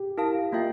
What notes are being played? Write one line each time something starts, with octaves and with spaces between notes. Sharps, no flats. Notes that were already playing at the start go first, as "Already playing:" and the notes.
Already playing: G4
E4 A#4 F5 A5
A#3 F4 A#4 E5 G5